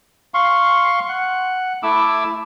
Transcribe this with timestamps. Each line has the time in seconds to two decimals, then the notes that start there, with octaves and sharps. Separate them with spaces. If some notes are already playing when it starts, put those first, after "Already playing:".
0.34 F5 C6 C#6
1.09 F#5
1.83 A3 E4 D6 E6